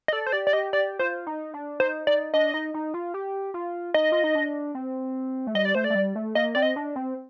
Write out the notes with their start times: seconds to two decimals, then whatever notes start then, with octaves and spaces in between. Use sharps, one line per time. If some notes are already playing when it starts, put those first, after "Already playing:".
0.08 D#5
0.12 A4 D5
0.27 C5
0.32 G4 D5
0.47 D5
0.53 G4 D#5
0.73 G4 D5
0.99 F4 C5
1.27 D#4
1.54 D4
1.80 D#4 C5
2.07 D#4 D5
2.34 D4 D#5
2.54 D#4
2.74 D#4
2.94 F4
3.14 G4
3.54 F4
3.94 D#4 D#5
4.12 F4
4.24 D#4
4.35 D4
4.75 C4
5.47 A3
5.55 G3 D#5
5.65 D5
5.75 A3 C5
5.84 D5
5.90 A3
5.95 G3
6.15 A3
6.35 A#3 D#5
6.55 C4 D5
6.62 D#5
6.76 D4
6.96 C4